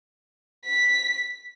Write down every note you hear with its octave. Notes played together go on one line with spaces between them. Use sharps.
B6